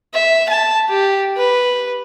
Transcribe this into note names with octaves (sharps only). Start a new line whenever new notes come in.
E5
A5
G4
B4